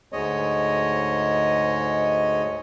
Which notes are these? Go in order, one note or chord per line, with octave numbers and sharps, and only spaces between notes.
D2 G#2 G#3 C#5 D#5